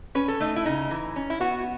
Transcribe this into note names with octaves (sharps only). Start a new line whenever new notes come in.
C#4 B4
A4
A3 D#4
E4
C#3 D#4
E3
C#4
E4
B3 F#4